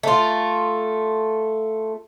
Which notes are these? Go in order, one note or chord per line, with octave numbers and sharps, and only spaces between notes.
A3 F4